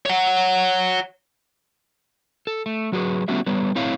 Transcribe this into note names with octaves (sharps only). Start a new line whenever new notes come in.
C#5 F#5
A4
A3
F#3 F#4 G#4 B4
G3 A3 B3 C#4 F#4 E5
G3 B3 B4 C#5
A3 C4 E4 C#5 F5